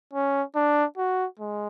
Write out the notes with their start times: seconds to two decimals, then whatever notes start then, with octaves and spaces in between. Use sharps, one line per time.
0.13 C#4
0.56 D4
0.97 F#4
1.39 G#3